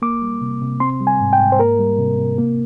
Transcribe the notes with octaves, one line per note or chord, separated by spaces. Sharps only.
A#3 D6
G3
C3
C3
C4 C6
G3
G#5
G#2
G5
G#2
C5
A#3 A#4
G3
C3
C3
A#3